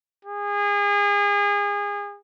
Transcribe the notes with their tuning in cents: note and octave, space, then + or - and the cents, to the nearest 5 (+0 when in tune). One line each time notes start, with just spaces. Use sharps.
G#4 -30